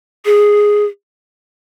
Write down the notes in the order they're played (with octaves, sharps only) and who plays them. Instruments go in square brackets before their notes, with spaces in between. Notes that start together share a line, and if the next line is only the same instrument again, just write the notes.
[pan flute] G#4